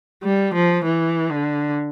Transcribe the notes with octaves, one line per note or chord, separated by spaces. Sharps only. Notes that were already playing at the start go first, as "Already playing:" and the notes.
G3
F3
E3
D3